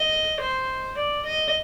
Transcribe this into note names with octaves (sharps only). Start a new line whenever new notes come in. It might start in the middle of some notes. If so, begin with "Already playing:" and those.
Already playing: D#5
C5
D5
D#5